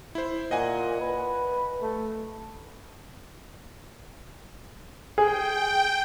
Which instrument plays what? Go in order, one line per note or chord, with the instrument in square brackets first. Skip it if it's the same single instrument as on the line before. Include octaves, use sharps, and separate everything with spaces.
[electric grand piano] E4 C5
[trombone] A#2 [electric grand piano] D#5 F#5 G#5
[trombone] B4
A3
[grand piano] G#4 [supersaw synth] G5